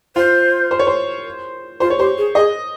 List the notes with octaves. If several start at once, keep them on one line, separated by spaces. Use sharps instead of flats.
F4 C5
C5
C#5
C5
F4 C5
C#5
G4 C5
G#4
G#4 D#5